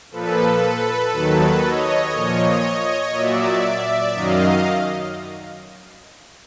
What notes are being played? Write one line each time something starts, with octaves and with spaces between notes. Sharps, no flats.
A#2 F3 A4 B4
D#2 D#3 F#3
C#5 D#5
A#2 F3
A#2 F#3 D5 E5
F#2 D#3 F#3 D#5 F5